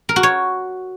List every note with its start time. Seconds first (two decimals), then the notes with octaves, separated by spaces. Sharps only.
0.09 A#4
0.16 F#4
0.23 C#5